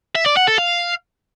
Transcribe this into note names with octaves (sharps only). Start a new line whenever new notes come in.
E5
D5
F#5
A4
F5